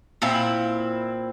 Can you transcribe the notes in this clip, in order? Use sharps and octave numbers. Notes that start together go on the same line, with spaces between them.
A#2 C4 E4